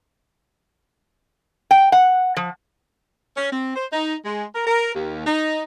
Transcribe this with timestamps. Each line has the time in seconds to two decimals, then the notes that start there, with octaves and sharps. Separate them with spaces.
1.71 G5
1.92 F#5
2.37 F3
3.37 C#4
3.52 C4
3.75 C5
3.91 D#4
4.25 G#3
4.54 A#4
4.66 A#4
4.94 D#2
5.26 D#4